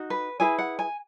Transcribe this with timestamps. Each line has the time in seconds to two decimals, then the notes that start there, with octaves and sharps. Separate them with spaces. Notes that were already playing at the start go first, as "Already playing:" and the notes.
Already playing: D#4 F#4
0.10 B4
0.40 E4 G#4 B4 G#5
0.59 F#5
0.79 G#5